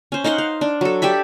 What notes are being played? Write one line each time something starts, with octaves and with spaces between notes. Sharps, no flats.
C#4 C5
D#4 F5 F#5 C6
F5
D4
F#3 A4
G4 D5 E5 B5